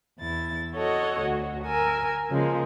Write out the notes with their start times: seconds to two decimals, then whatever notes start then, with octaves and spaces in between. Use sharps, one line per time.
0.19 E2 E4 A6
0.75 F#4 A4 C#5 D#5 F#5
1.21 D2 F#4
1.65 A#4 G#5 E6
2.30 C#3 F3 G#3 A#3